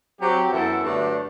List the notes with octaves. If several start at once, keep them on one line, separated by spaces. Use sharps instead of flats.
F#3 C4 G4
F#2 E3 B3 E4 A4
G2 D3 F#3 A3 D4